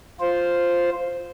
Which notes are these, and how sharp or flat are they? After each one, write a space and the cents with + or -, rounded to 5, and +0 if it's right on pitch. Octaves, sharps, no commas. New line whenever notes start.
F4 +0 C5 +0